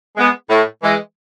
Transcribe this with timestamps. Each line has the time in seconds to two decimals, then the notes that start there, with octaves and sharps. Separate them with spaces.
0.16 G#3 B3
0.49 A2
0.82 E3 G#3